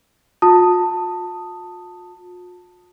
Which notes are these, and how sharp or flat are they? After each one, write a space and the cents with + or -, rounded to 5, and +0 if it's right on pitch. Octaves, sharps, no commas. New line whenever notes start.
F4 +45 A5 +15 D#6 +0